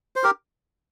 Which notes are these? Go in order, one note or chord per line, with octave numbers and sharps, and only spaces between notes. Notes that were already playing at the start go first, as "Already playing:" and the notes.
C5
G4 A#4